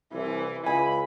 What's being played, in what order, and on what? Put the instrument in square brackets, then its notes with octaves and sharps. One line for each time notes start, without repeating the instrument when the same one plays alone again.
[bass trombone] C2 [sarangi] E3
[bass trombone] C#2 [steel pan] G#5 [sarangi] B5